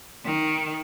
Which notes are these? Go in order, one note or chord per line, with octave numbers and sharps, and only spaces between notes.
D#3